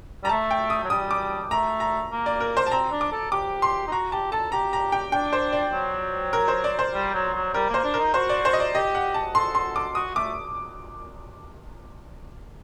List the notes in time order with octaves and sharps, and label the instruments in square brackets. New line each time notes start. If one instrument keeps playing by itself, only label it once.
[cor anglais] G3 [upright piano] A#5
[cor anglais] A3 [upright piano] A5
[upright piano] G5
D#6
[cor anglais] F#3
[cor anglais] G3 [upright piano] D#6
[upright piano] D6
[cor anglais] A3 [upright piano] A#5
[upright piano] A#5
[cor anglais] A#3
[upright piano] D5
A#4
C5
A5
[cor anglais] C4 [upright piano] A#5
[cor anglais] D4
[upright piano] D6
[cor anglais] A4
[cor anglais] G4 [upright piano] D6
[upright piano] C6
[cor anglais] D#4
[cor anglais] F#4 [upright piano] A#5
[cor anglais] G4 [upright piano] A5
[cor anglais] A4 [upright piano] A5
[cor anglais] G4 [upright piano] A#5
[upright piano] A#5
G5
[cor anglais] D4 [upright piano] G5
[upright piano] C5
D5
[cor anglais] F#3
[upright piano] A#4
C5
D5
C5
[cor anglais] G3
F#3
F#3
[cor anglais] G3 [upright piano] A#4
[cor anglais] A#3 [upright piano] C5
[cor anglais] D4
[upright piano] A#4
[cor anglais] D#4
[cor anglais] F#4 [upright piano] C5
[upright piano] D5
C5
D#5
D5
[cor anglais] G4 [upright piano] D#5
[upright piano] F#5
A5
[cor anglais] A4 [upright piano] C6
[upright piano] C6
D6
[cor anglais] F#4 [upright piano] D#6
[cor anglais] A3 [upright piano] D6